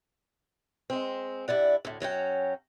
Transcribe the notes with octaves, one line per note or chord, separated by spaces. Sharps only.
G#3 C4
G2 E4 D5 F#5
D2 A2
F#2 F#3 C#4 G5